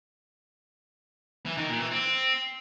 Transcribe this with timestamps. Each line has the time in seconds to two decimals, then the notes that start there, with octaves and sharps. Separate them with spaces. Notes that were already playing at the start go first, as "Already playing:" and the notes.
1.46 E3
1.57 D#3
1.69 A#2
1.80 E3
1.92 C4